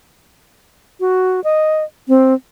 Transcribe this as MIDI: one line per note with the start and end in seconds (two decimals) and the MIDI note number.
1.00 1.43 66
1.44 1.84 75
2.08 2.34 60